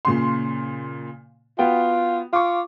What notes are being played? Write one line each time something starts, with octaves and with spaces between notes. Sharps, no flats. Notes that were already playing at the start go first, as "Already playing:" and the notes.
A#2 C#3 C6
B3 F4 F#4 G5
F4 C#6 D6